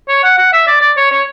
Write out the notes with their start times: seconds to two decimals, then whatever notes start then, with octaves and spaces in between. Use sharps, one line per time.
0.09 C#5
0.24 F#5
0.38 F#5
0.53 E5
0.67 D5
0.81 D5
0.97 C#5
1.11 C#5